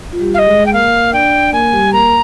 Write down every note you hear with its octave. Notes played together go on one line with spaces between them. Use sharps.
F4
G3 G4
F5
D#5
G#3 G#4
G5
A#3 A#4 F5
D4 D5 G5
A#3 A#4 G#5
G3 G4
A#3 A#4 A#5